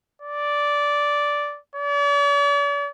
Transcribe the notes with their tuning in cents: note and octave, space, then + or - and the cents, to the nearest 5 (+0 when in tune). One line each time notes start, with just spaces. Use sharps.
D5 -10
D5 -45